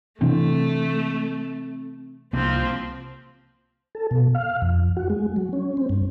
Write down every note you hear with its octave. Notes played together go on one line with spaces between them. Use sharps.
C3 E3 A3 C4 D4
C2 F3 A#3 C4
A4
B2
F5
F2
F#4
G#3
F#3
C#4
C4
G2